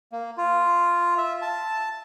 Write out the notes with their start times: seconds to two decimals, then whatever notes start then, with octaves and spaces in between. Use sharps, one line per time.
0.12 A#3
0.37 F4
1.18 E5
1.42 A5